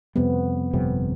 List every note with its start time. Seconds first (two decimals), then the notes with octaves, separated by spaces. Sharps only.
0.16 F2 C3 G3 B3
0.73 G1 F2 C3 G3